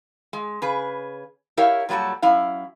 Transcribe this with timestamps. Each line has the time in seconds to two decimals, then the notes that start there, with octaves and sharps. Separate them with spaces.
0.33 G#3
0.62 C#3 G#4 B4
1.57 E4 G4 A#4 C#5 F5
1.89 A#2 F#3 G3 F#4 A4
2.22 F#2 E4 F5